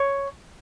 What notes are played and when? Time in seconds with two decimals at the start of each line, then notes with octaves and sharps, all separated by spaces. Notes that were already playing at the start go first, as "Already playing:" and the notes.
Already playing: C#5